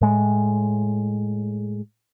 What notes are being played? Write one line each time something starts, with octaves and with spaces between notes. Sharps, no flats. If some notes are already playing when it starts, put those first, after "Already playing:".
A2 G#3